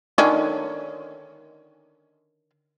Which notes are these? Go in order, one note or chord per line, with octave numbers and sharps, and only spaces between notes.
D3 D#3 C#4